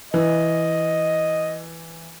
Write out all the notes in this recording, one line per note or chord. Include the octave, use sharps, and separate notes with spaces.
E3 D#5